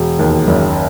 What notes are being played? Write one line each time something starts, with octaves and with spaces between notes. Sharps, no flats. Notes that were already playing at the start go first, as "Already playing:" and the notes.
Already playing: E1
D#2
F#1